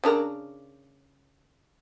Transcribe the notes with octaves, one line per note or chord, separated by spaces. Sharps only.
C#3 D4 A#4